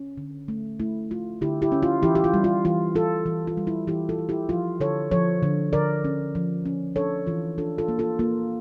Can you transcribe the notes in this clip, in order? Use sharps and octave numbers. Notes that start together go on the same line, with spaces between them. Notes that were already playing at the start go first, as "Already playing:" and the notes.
Already playing: C#4
D3
A3
A3 E4
A3 F4
D3 E4 G4
E4 G4
C#4
F4
E3 E4 G4
G4
F4
G3
F4
E3 F4
E3 F4 A4
E3
F4
G3
E4
E3 E4 G4
F4 A4
E3
E4 G4
F3 F4
D3 A4 C#5
F3 A4 C#5
D3
D3 A#4 D5
C#4
F3
C#4
D4 A4 C#5
E3 F4
D4 F4 A4
F4 A4
A#3
F4 A4
A#3 F4